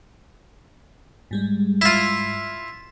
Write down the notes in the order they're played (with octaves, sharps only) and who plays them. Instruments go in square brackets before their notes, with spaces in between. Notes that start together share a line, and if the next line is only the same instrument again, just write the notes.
[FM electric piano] G#2 G3 G#3
[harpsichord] E4 F4